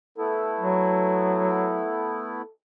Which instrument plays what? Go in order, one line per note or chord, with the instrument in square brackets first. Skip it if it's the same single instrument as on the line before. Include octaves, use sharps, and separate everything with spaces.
[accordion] A3 B3 E4 [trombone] A4
[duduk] F#3